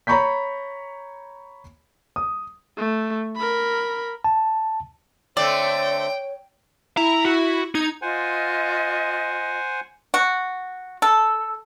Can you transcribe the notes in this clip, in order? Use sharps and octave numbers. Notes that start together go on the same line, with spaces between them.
C#5 A#5 B5 C#6 G6 B6
D#6
A3
A#4 B5
A5
D3 A3 C4 C#5 D5 G5
E4 A#5
F#4
D#4 G#6
F4 C5 D#5 F#5 G#5
F#4
A4